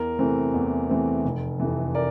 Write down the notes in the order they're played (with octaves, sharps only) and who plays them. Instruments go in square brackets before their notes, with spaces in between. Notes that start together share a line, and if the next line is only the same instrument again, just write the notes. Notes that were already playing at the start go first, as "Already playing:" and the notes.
Already playing: [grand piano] E2 A#4
C3 E3 A3 C4
E2
C3 E3 A3 C4
F1
F2 C3 E3
A#4 D5